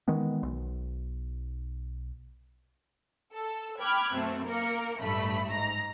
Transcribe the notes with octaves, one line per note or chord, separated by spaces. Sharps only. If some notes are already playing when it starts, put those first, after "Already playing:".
D#3 E3 G#3 B3
B1
A4
G5 B5 D6 F6 F#6 G#6
F#2 B2 A3 C4
A#3 A#4 C#7
A1 G2 A3 B5
G#2 A#5